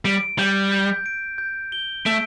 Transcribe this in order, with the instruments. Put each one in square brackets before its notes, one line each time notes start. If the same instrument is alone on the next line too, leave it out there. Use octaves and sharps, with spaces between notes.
[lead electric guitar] G3 [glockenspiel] D7
[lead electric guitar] G3 [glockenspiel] G6
[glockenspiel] G6
D7
G6
G7
[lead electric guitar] A3 [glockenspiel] D7